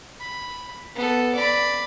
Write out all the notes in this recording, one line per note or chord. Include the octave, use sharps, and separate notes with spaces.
B5
B3 A4
D5 B5